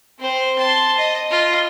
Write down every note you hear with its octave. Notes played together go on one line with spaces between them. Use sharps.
C4 C5
A5 C6
D#5
F4 D#5